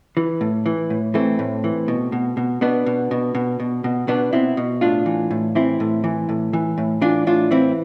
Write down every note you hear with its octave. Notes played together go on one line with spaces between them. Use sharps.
E3
A2
E3
A2
E3 A3 C4
A2
E3
B2
B2
B2
B2 B3 D4
B2
B2
B2
B2
B2
B2 B3 D4
B2 C4 E4
B2
A2 D4 F4
E3
A2
E3 C4 E4
A2
E3
A2
E3
A2
E3 D4 F4
A2 D4 F4
E3 C4 E4